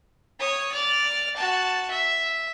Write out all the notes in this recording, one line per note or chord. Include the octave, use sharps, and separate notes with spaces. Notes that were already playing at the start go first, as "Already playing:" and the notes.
C#5 D#6
D5 F6
F#4 A5
E5